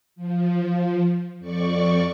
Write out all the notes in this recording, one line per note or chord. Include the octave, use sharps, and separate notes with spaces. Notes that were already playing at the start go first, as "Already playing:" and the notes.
F3
F2 D5 C#6